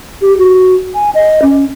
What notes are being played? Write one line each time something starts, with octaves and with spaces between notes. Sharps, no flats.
G4
F#4
G#5
D#5
C#4